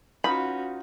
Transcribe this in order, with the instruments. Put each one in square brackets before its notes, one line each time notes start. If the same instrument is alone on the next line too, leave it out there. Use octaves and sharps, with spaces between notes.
[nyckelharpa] C#4 F#4 [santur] D#4 F4 F#5 [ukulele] B4 [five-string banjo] B5